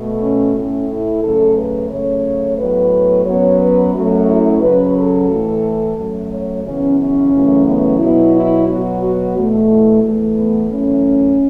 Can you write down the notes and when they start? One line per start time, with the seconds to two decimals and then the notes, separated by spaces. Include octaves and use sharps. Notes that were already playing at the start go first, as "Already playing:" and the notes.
Already playing: B2 A3
0.22 C#4
0.55 A2 A3 C#4
0.89 E4
1.23 F#2 C#3 A3 A4
1.57 B4
1.90 F#2 C#3 A3 C#5
2.58 A2 F#3 B3 B4
3.25 F#2 F#3 B3 C#5
3.60 B4
3.94 F#2 F#3 A3 F#4
4.27 E4
4.61 F#2 C#3 F#3 B4
4.96 A4
5.29 A2 E3 A3
5.96 F#2 F#3 A3
6.31 C#5
6.64 F#2 C#3 E3 B3 C#4
6.99 C#4
7.32 F#2 C#3 E3 A3
7.66 B3
7.99 B2 F#3 B3 E4
8.34 E4
8.68 B2 F#3 B3 F#4
9.02 F#4
9.36 E2 B2 A3
9.69 E4
10.03 E2 E3 A3
10.37 B3
10.71 F#2 E3 A3 C#4